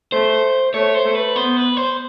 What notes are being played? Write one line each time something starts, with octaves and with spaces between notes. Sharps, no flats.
A3 C5
A3 C#5
C5
A3
B4
B3 C5
B4
C5